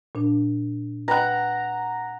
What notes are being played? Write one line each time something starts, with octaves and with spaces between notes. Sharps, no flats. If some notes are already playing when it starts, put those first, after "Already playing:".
A#2 D4
B4 F#5 G5 A#5 B5